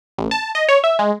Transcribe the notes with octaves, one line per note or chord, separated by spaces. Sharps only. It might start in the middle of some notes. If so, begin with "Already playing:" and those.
A1
A5
D#5
C#5
E5
G#3